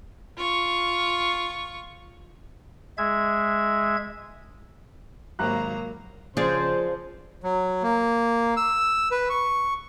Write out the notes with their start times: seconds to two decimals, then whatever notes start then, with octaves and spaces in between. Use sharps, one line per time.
0.37 F4 C#6
2.98 G#3 E5 G#6
5.39 G#1 F#3 A#3 A#4 A#5 F#6
6.37 C#3 F3 G#4 C5 D5
7.44 F#3
7.83 A#3
8.57 E6
9.11 B4
9.30 C#6